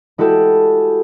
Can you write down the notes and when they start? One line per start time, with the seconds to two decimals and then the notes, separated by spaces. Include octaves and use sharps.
0.18 G#3 E4 F#4 G4 A4